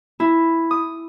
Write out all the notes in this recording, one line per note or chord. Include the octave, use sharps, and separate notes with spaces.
E4
D#6